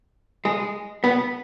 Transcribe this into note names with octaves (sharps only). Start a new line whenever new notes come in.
G#3
B3